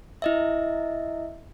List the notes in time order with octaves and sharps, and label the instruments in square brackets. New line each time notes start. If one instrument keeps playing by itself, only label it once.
[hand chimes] E4 D#5 E5